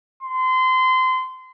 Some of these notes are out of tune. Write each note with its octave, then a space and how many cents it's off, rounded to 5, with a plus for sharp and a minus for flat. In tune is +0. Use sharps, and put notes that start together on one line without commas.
C6 -25